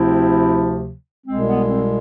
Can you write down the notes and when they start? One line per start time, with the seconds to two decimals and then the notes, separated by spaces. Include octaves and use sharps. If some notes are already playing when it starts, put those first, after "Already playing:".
Already playing: D2 C3 F3 C4 E4
1.27 C2 B2 G#3 C4
1.48 B3
1.68 C4